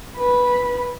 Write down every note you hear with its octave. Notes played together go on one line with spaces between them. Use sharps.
B4 B5